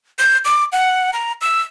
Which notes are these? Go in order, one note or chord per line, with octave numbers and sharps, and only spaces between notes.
G6
D6
F#5
A#5
E6